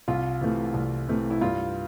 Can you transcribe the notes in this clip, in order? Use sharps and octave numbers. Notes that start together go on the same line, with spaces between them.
C2 F4
C3 E3 A3
C2
C3 E3 A3
E4
G2 F4